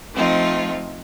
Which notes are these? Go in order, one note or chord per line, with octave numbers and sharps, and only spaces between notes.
F3 A3 C4 D#4 F4